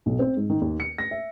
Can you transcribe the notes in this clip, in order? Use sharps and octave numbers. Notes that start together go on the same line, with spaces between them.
B1
C4
G#2
D#3
D#2
C#7
A#6
E5